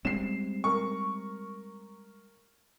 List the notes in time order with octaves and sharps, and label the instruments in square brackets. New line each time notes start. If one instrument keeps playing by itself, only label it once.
[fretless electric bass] G3 G#3 C4 [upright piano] C7 E7
[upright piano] A#4 C#6